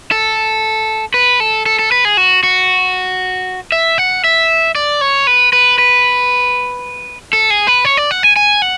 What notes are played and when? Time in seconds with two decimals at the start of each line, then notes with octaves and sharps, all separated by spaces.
0.11 A4
1.14 B4
1.40 A4
1.66 A4
1.79 A4
1.92 B4
2.05 G#4
2.17 F#4
2.43 F#4
3.72 E5
3.98 F#5
4.24 E5
4.75 D5
5.01 C#5
5.27 B4
5.53 B4
5.78 B4
7.33 A4
7.50 G#4
7.67 B4
7.85 C#5
7.97 D5
8.11 F#5
8.23 G#5
8.36 G#5
8.62 F#5